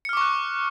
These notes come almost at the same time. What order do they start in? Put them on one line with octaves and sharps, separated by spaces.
C#7 F6 D6 C#6 F#6